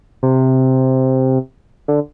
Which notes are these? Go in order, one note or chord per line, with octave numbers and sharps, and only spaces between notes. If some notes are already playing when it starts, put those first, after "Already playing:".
C3
D3